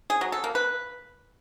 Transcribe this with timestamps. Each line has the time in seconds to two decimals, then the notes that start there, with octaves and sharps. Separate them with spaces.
0.10 G#4
0.21 F#3
0.32 A4
0.44 A#3
0.55 B4